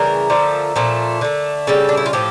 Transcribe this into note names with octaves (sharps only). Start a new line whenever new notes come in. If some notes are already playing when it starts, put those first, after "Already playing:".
Already playing: C#3 E3 G3 A#4
D3 F3 A3
A#2 F3 A3
D3 A3
C#3 G3 A4
D4
E4
F4
A2 F3 G4